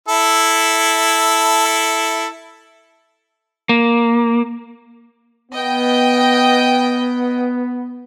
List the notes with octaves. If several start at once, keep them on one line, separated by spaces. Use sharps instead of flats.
E4 A4
A#3
B3 D#5 G5